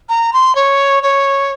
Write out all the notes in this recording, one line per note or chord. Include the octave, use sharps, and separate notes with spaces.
A#5
C6
C#5
C#5